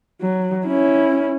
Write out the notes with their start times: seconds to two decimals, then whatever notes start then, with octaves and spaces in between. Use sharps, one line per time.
0.21 F#3
0.66 C#4 E4